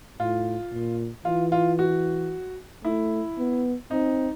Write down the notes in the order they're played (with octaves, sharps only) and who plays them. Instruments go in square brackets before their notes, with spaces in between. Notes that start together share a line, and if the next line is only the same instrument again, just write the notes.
[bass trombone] A2 [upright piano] F4
[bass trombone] A#2
[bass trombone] E3 [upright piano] F4
[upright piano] F4
F#4
[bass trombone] A3 [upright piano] E4
[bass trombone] B3
[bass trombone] C4 [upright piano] D#4